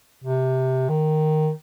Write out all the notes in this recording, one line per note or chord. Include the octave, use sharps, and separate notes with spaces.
C3
D#3